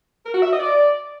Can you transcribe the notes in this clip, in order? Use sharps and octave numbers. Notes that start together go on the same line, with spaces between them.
A#4
F#4
E5
D#5
D5